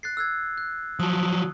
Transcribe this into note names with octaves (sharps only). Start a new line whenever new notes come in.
F#6 A6 C7
E6 F#6 G#6
F#6
F3 F#3 D#6